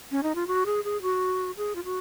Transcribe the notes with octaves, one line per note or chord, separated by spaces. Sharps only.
C#4
D#4
F4
F#4
G#4
G#4
F#4
G#4
F4
F#4